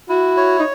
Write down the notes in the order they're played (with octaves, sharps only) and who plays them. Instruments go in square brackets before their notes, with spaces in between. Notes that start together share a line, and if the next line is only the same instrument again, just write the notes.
[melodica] E4 [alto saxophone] F#4
[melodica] C#5
[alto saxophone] D#4